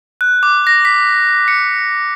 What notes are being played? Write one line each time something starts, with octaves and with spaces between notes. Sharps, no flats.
F#6
D6
A#6
B6
C#7